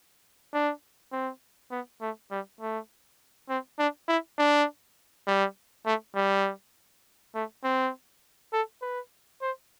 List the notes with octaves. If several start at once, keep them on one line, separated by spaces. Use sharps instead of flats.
D4
C4
B3
A3
G3
A3
C4
D4
E4
D4
G3
A3
G3
A3
C4
A4
B4
C5